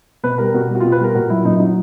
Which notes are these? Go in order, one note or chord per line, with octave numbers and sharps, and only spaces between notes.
B2 B4
G3 A#4
B2 F#4
G3
F#4
B2 F4
B4
G3 A#4
A#2 F#4
F#3 E4
A#2 D#4
E4
F#3 D#4